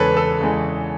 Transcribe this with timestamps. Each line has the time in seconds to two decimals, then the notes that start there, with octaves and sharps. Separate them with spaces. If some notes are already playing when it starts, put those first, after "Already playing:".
Already playing: E2 C#3 E3 G#3 A4 B4 C#5
0.17 A4
0.40 E2 C#3 E3 G#3